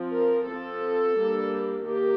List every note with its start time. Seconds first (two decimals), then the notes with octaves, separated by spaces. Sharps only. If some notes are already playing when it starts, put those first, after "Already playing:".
Already playing: F3 C4
0.12 A#4
0.46 F3 C4 A4
1.16 G3 A#3 D4
1.84 D#3 A#3 G4